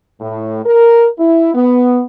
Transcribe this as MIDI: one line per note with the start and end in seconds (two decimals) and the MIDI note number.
0.21 0.59 45
0.65 1.08 70
1.19 1.53 64
1.54 2.03 59